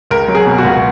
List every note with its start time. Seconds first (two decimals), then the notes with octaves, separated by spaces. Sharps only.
0.11 C#2 A#4
0.28 F#3
0.35 G#4
0.46 B2
0.58 F#4
0.64 C#2